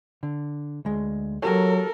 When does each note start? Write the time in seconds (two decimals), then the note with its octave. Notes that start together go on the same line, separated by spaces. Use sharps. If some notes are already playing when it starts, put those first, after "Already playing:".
0.23 D3
0.85 D2 G#3
1.42 F#3 F#4 G4 A4 A#4 C#5